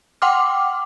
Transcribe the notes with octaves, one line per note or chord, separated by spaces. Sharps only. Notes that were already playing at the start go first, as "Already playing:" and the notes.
F#5 G5 C6 D6 F6